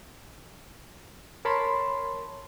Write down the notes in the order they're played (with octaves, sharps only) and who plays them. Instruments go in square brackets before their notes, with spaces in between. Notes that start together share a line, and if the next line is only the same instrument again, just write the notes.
[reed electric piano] A#4 C#5 A5 B5 C6